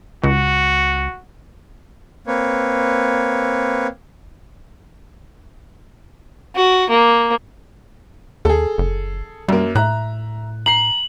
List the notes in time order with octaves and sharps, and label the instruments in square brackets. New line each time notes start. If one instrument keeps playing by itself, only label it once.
[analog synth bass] C#2 [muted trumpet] F#4
[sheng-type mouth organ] A#3 C4 B4 C#5
[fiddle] F#4
A#3
[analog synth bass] D#2 [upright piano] G#4 A4
[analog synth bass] F#1
[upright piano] F#2 A#3 [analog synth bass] G3
[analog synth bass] A2 [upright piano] E5 A#5 F#6
[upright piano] A#5 C7 [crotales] F#7